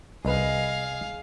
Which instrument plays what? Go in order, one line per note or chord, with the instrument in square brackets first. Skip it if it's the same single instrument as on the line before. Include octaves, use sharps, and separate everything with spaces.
[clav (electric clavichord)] C2 B4 [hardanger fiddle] G#4 F5 [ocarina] D#5